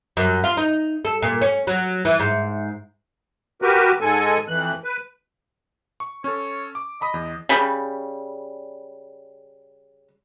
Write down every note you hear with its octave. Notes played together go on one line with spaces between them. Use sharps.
F#2
F4
D#4
A4
A#2
C#4
F#3
E3
G#2
F#4 G4 A#4 B4
G#2 G#3 A4 G#5
F2 E3 F#6
B4
C#6
C#4 A4 C#5
D6
D#5 A#5 B5 D#6
E2
C#3 G3